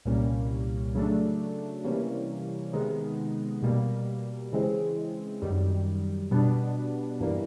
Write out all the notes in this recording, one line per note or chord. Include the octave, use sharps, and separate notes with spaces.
C2 A#2 G3 A#3 C#4
C#3 F#3 A3 D4
C3 E3 G3 A#3 C#4
C3 D#3 G#3 B3 D#4
B2 G3 A#3
C#3 E3 G#3 C4
F#2 D#3 G3
B2 G3 B3 D4
G2 E3 G3 A#3